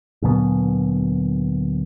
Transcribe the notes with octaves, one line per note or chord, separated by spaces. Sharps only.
D2 A#2 F#3 B3